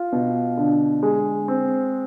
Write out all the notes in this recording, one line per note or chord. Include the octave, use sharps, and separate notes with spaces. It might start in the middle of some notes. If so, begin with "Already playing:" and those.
Already playing: F4
B2
D3
G#3
C4